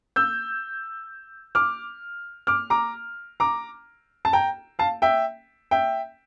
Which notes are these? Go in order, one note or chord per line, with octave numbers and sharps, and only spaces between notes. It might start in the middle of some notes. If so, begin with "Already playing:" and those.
E6 G6
D6 F6
D6 F6
A#5 D6
A#5 D6
A5
G5 A#5
F5 A5
E5 G5
E5 G5